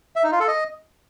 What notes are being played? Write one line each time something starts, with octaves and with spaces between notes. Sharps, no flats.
E5
D#4
F4
A4
D#5